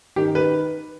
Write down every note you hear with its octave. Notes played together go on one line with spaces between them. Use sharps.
D#3 G4
B4